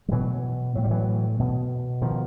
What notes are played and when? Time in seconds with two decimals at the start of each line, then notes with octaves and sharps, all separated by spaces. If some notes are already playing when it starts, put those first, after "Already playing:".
0.09 G3
0.12 B2 E3 F#3
0.75 A2 F#3
0.84 G3
0.91 E3 F#3
1.39 B2
2.02 B2 D#3 F3